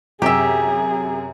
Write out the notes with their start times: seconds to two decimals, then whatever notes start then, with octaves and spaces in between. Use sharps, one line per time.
0.22 F#2 C3 G4 G#4 E5